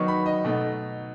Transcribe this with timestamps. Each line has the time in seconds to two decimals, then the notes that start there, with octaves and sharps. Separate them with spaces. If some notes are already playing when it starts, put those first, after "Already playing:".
Already playing: D#3 F#3 B3 D#4 C#6
0.08 B5
0.26 D#5
0.45 B2 A3 D#4